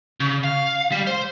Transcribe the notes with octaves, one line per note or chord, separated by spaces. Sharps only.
C#3
F5
G3
C5